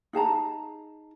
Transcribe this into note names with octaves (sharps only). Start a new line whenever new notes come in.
D#4 G#4 A5 A#5